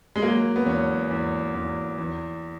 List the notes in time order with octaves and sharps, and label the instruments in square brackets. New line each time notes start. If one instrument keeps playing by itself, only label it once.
[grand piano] G#3
F#3 A#3
B3
E2 C#4
E2
E2
E2